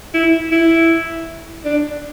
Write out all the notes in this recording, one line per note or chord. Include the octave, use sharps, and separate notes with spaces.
E4
E4
D4